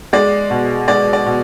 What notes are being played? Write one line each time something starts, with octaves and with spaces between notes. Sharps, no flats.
G#3 D5
B2
G#3 D5
D5
B2